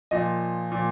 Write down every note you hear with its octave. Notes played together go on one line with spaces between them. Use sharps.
A#2 F3 D#5
A#2 F3